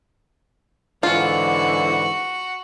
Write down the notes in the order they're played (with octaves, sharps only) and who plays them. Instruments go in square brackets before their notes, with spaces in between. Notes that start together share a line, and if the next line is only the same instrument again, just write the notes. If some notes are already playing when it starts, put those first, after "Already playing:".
[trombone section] G#2 D3 E3 [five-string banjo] F4 [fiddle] F#4